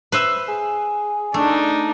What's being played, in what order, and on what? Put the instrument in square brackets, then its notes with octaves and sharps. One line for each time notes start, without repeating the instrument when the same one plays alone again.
[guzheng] B4 C5 E5
[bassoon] G#4
[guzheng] A3 [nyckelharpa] D4 D#4